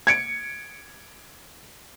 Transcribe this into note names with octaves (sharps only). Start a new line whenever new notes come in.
G#6 C#7 D7